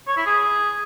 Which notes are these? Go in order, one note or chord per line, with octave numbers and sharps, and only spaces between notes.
C#5
E4
G#4